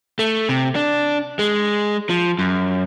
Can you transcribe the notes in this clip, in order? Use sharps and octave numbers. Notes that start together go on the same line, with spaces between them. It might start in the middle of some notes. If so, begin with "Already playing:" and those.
A3
C3
D4
G#3
F3
F#2